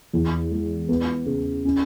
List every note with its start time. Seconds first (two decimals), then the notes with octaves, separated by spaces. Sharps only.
0.13 E2
0.51 G#3
0.89 B3
1.26 C#3
1.65 C#4